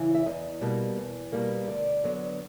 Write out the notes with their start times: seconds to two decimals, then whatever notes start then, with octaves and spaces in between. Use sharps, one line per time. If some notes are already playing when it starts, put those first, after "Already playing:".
Already playing: C#3 E3
0.15 E5
0.26 E2 D#5
0.61 B2 G3 A#3
0.98 E2
1.32 B2 G3 A#3
1.68 D2 D5
2.04 D3 F#3 B3